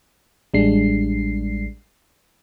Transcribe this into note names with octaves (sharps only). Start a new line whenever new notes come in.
A1 G3 G#3 D4 C7